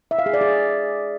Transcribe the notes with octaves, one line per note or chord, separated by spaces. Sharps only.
E5
F5
G#4
D5
G#4